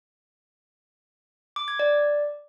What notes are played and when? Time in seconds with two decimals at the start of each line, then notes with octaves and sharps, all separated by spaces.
1.56 D6
1.68 G#6
1.79 D5